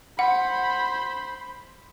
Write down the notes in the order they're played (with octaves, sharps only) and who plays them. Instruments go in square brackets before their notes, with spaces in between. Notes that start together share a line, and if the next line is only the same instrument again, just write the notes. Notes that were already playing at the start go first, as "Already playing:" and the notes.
[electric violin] C5 B5 [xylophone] F#5